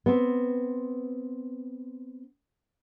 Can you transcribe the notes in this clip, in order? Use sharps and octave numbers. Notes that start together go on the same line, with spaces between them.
B3 C4